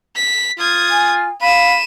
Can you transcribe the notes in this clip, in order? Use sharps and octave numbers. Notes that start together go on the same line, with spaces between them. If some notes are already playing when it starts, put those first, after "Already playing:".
B6
F4 D#6 G#6
G#5
F5 B5 D#7 E7